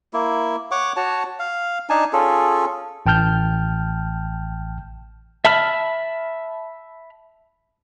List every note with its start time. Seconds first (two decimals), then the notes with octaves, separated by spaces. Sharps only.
0.13 A#3 E4
0.71 C#5 F#5 C#6 D6
0.96 F#4 C#5 A5
1.39 F5
1.90 D4 D#4 G#5 A5
2.13 C#4 F4 G#4 A4
3.06 A1 G5 A5 F6 G6
5.45 E5 A5 B5 F6